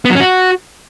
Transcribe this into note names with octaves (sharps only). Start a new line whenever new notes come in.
B3
F#3
C#4
F#4